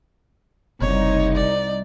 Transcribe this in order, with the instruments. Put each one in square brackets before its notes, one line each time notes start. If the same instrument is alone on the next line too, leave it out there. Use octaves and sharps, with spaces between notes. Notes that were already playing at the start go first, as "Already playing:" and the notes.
[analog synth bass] F#1 [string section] C2 D#4 [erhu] C#5
[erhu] D5